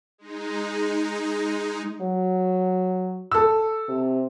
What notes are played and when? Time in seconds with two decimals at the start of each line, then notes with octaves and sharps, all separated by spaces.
0.18 G#3 D#4
2.01 F#3
3.32 A4 E6
3.89 C3